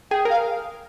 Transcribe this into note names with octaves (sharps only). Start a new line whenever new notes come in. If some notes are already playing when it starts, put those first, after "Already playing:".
G#4 G5
A#4 F5